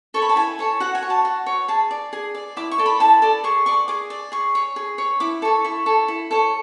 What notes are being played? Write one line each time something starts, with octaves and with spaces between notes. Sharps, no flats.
A4 C#5 C#6
B5
A5
E4 G#5
A4 C#5
F#4 F#5
G#5
C#5
A5
F#4
C#5
G#4 A5
D5
G#4
D5
E4 D6
C#6
A4 D5
B5
E4 A5
A4 D5
G#4 C#6
D5 C#6
G#4 D6
D5
G#4 C#6
C#5
G#4
C#5
E4 D6
A4 C#5
E4 C#6
A4 C#5
E4
A4 C#5